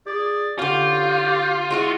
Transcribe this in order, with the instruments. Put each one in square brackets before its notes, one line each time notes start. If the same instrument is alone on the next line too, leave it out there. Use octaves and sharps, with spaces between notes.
[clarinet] G#4 [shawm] D5
[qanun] D3 C#4 [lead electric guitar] F4 [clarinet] G4 [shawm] G5
[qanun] G#3 E4 F#5 [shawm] F#4